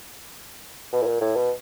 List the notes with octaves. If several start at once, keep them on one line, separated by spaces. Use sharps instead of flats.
B2
A2
A#2
A2
B2